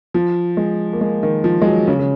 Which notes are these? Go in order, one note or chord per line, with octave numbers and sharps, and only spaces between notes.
F3
G#3
A#3
G#3
D#3
F3
G#3
F#3
C#3
C#3